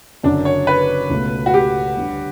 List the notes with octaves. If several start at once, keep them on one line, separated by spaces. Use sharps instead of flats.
F#1 F#2 D3 D4
C#5
B4
C#2 B2 A3
F#4
G4
D2 D3 G3